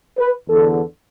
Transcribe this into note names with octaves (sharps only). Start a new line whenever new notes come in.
B4
E2 D3 A4